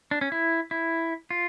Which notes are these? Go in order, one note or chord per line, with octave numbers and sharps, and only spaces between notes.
D4
C#4
E4
E4
F4